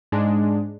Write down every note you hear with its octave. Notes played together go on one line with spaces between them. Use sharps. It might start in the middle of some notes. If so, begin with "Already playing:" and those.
G#2 G#3 D4